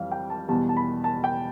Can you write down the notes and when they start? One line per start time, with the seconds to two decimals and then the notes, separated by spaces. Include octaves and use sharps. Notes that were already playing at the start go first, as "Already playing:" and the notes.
Already playing: F2 E3 G3 F5
0.12 G5
0.30 A5
0.48 E2 B2 G3 A5
0.69 A5
0.77 B5
1.04 A5
1.24 G5